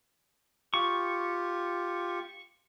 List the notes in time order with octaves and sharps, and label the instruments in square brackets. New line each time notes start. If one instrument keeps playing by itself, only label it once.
[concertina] F4 G4 [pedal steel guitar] C#6